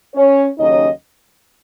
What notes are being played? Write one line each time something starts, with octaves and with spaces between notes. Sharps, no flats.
C#4 C#5
D#2 C#3 F#3 C#4 D#4 D#5